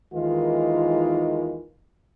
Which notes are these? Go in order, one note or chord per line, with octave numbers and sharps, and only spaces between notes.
D#2 D#3 E3 G#3 F4 A#4